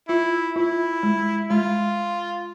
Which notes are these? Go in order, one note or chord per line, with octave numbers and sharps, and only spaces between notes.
E4 F4
E4 F4
G#3
G#3 F4